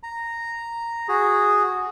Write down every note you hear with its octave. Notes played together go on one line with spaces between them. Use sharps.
A#5
F#4 G#4